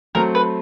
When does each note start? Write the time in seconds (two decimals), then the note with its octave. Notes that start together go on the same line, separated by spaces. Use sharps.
0.15 F#3 A3 C4 A#4
0.35 B4